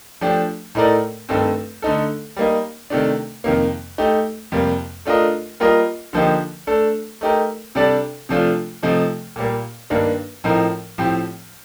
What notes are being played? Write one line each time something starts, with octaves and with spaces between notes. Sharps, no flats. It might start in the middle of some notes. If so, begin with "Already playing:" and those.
F3 A3 D4 G4
A2 A3 D#4 A#4 D5
G2 D#3 A3 C4
D3 A3 D#4 A4
G3 A#3 D#4
C3 D#3 A3 D4
F2 C3 D#3 A#3
A3 D#4 G4
F2 C3 G3 A#3
A3 D4 F4 A#4 D#5
G3 A#3 F4 A#4 D#5
D3 F3 A#3 D#4 G4
A3 D4 A4
A3 D#4 G4 A#4
C3 G3 D4 A4 D5
C3 F3 A3 D4 F4
C3 F3 A3 D#4
A#2 G3 A#3
G2 D#3 A#3 D4
A2 F3 C4 D#4 A#4
A2 F3 C4 G4